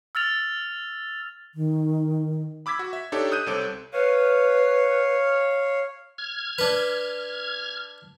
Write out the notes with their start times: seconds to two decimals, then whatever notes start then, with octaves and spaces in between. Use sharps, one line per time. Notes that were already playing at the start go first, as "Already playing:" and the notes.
0.15 E6 F6 A6 F7
1.55 D#3
2.66 B5 D6 E6 G#6 B6
2.79 F#4
2.93 E5
3.12 D4 D#4 G4 A4 C#5
3.32 D#6 F#6 G6 D#7
3.46 C2 C4 A4 C#5 D6 D7
3.93 B4 C#5 F5
6.18 F6 G#6
6.58 D4 B4